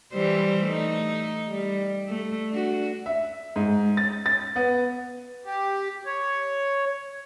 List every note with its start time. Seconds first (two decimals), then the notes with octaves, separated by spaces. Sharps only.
0.12 E3 G3 C5
0.64 A3 D#4
1.48 G3
2.08 A3
2.50 D4 F#4
3.06 E5
3.56 G#2
3.97 A6
4.26 A6
4.56 B3
5.45 G4
6.06 C#5